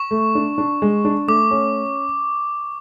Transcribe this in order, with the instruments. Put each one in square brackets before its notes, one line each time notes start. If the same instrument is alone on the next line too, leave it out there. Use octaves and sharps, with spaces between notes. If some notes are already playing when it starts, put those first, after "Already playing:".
Already playing: [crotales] C#6
[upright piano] A3
D4
D4
G#3
D4
[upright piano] A3 [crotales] D6
[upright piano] C#4